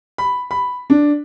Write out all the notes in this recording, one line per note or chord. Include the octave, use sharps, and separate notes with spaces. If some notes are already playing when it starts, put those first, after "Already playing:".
B5
B5
D4